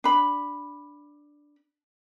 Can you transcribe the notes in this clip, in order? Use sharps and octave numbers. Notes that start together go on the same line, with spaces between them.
D4 B5